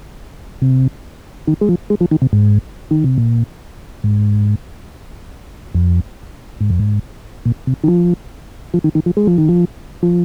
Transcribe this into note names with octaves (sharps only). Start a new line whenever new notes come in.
C3
D#3
G#3
F3
G#3
F3
D#3
C3
G#2
D#3
C3
A#2
G#2
F2
G#2
F2
G#2
A#2
C3
D#3
F3
F3
D#3
D#3
F3
G#3
F3
D#3
F3
F3